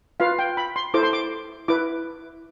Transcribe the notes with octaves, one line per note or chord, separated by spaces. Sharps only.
F4 B4 F5
G5
B5
C6
E4 A4 C5 D6
C6
D6
E4 B4 D6